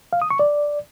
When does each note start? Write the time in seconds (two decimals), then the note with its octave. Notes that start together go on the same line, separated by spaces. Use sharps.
0.13 F5
0.22 D#6
0.30 C#6
0.39 D5